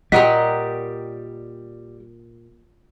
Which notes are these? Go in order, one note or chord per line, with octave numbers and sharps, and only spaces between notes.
A#2 G3 F#4 G4 A#4 D#5 F#5 B6